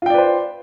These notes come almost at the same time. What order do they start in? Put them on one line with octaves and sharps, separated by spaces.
F4 G5 D5 B4 C5